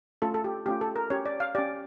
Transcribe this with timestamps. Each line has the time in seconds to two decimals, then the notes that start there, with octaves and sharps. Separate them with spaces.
0.22 A3 C#4 F4 A4
0.34 A4
0.44 G4
0.66 A3 C#4 F4 G4
0.81 A4
0.96 A#4
1.10 C#4 G4 C#5
1.26 D5
1.40 F5
1.55 C#4 G4 D5